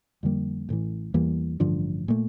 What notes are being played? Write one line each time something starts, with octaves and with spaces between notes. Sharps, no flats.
F2 D3 G3 A#3
A1 A2 E3
E2 E3 G3 A#3
A1 G2 D3 F3
A#2 A3